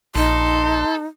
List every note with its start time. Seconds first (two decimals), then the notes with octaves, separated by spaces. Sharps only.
0.16 A#1 D#4 A4 C6